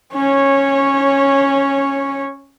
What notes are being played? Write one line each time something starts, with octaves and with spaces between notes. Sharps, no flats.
C#4 C#5